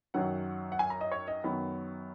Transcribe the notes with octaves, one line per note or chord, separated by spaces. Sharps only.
F#2 D#3 F#3 F#5
F#5
G#5
A#5
D#5
C#5
D#5
F#2 D#3 F#3 B3